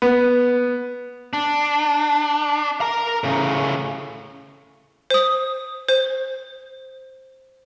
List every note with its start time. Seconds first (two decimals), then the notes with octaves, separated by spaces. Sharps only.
0.02 B3
1.33 D4
2.81 A#4 A#5
3.24 A2 C#3
5.10 C5 D#6
5.89 C5